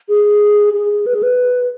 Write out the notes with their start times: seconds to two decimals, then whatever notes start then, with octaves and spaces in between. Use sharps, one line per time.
0.09 G#4
0.74 G#4
1.06 B4
1.15 G#4
1.23 B4